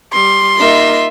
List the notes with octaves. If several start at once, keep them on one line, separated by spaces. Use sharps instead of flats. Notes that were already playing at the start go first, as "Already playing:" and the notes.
G3 C6
A#3 D#4 F4 E5